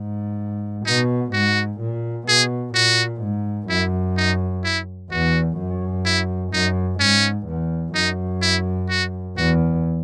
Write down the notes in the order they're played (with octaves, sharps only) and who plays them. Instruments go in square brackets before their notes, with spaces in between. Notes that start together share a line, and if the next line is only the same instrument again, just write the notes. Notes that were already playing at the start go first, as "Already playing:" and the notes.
Already playing: [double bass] G#2
[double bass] B2 [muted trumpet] D#4
[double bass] G#2 [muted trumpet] F#4
[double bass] A#2
[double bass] B2 [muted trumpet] G#4
[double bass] A#2 [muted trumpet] F#4
[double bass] G#2
[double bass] F#2 [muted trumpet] E4
[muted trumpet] D#4
E4
[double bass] E2 [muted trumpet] F#4
[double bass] F#2
[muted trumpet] E4
[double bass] F#2 [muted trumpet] D#4
[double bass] G#2 [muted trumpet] C#4
[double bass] E2
[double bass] F#2 [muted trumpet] D#4
[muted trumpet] E4
F#4
[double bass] E2 [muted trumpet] F#4